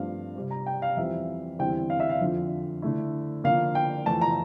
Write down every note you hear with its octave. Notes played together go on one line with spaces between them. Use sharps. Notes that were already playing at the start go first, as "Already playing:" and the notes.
Already playing: G2 F3 A3 C4 F5
C3 G3 C4
A#5
G5
F5
F2 E3 G3 C4 E5
E2 D3 G3 C4 E4 G5
F5
E5
F5
F2 D3 F3
D3 A3 E4
D3 F3 A#3 F5
G5
F2 E3 A3 A5
A#5